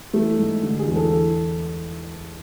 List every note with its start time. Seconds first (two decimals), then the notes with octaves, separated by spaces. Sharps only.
0.13 E3 A3
0.38 G#2
0.63 D3
0.79 G#4
0.88 E2
0.96 A4
1.12 E3